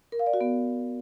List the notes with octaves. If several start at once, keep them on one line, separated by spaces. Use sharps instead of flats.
A#4
F5
D5
F#4
B3